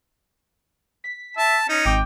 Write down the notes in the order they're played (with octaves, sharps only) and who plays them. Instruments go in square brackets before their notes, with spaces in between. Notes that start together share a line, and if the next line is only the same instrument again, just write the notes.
[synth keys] B6
[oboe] E5 [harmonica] A5
[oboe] C#4 [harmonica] D#4
[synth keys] G#1 D6 [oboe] G5